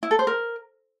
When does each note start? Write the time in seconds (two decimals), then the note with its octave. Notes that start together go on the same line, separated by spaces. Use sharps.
0.03 E4
0.11 A4
0.19 C5
0.27 A#4